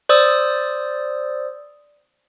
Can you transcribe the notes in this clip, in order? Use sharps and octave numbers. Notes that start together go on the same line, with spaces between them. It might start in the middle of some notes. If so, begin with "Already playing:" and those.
C5 D5 D#6 E6